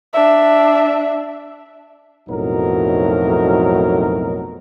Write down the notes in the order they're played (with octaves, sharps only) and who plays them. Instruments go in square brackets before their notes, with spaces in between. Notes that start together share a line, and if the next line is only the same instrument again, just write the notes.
[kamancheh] D4 E5
[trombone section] B1 F2 A2 F#3 D#4 A#4